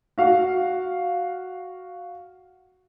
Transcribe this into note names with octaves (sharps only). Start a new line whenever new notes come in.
F#4 F5